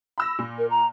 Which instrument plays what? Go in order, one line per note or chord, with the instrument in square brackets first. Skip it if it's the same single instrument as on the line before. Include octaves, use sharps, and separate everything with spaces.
[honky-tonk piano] B5 E6 A#6
A#2
[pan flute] A#4
A#5